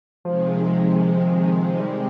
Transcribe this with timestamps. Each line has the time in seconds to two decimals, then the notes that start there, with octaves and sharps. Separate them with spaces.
0.24 C3 D#3 F3 G#3
1.80 G3